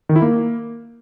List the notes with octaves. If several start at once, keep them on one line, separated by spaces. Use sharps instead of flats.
D#3
E4
A#3